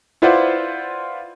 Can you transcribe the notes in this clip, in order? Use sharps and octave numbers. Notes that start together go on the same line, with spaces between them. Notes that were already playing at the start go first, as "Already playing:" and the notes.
E4 F4 B4 C5 D5 F#5